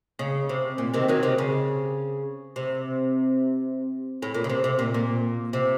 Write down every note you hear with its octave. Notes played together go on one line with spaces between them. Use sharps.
C#3
C3
A#2
C3 D#3
D#3 F#3
C3 D#3
C#3
C3
A2
A#2
C#3
C3
C3
A#2
A#2
C3